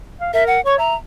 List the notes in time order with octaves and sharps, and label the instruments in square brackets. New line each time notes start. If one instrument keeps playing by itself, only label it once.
[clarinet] F5
[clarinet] A#4 [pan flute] E5
[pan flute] F#5
[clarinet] C#5 [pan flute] C#6
[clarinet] E5 [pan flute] A#5